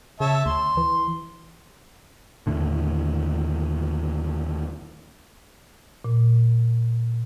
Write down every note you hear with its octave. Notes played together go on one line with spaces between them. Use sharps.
C#3 C#5 E5 A5
D2 C6
E3
D#2 A2 D3
A#2